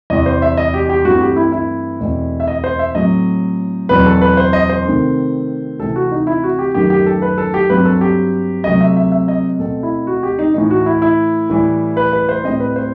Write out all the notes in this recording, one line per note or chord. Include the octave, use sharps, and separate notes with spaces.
E2 C3 E3 G3 D#5
C5
E5
D#5
G4
G4
G2 E3 A3 C4 F#4
G4
E4
E4
E2 B2 A3 C4
E5
D#5
C5
E5
A2 F#3 A3 C4 D#5
E2 B2 F#3 C4 B4
A4
B4
C5
D#5
C5
C3 D#3 A3 C4
C3 E3 A3 C4 A4
F#4
D#4
E4
F#4
G4
F#2 D#3 A3 G4
G4
A4
B4
A4
G4
G2 F#3 C4 B4
A4
G4
C3 F#3 A3 C4 D#5
E5
E5
E5
D#5
B2 A3 C4 A4
E4
F#4
G4
D#4
A2 E3 A3 D#4
F#4
E4
E4
A2 E3 G3
B4
B4
C5
A2 G3 C4 D#5
B4
C5